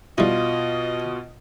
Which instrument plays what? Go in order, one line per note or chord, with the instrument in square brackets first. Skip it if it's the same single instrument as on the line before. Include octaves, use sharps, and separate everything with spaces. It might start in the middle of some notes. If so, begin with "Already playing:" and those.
[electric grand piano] B2 F4 [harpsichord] G3 E4 [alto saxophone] D#5